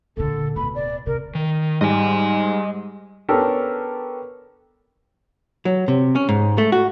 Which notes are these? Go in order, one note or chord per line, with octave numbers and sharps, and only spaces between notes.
A#2 D3 A4
D1 B2 B5
D5
C3 A#4
D#3
G#2 G3 D#5 G#5
B3 C#4 D4 G4 A4 A#4
F#3
C3
C#4
G#2
A3
F#4